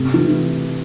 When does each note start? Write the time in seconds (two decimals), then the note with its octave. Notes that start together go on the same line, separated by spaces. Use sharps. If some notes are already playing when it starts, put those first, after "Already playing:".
Already playing: C3 A3
0.14 E3